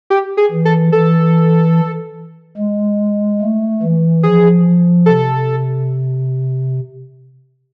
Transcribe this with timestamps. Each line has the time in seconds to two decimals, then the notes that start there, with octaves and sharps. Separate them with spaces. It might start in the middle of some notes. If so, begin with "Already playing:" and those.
0.10 G4
0.37 G#4
0.51 E3
0.65 A4
0.92 E3 A4
2.57 G#3
3.41 A3
3.82 E3
4.23 F3 G#4
5.06 C3 A4